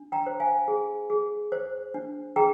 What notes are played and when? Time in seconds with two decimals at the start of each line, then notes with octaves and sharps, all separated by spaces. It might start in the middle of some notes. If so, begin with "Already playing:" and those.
Already playing: D4
0.12 G5 A#5
0.26 C5
0.40 F5 G#5
0.68 G#4
1.10 G#4
1.52 C5
1.94 D4
2.36 G#4 G5 A#5